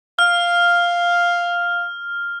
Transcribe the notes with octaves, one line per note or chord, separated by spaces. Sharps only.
F5 F6